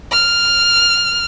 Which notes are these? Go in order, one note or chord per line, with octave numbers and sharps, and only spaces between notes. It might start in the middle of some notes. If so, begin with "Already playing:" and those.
F6